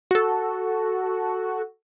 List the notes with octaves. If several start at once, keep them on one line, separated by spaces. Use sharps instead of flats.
F#4 A4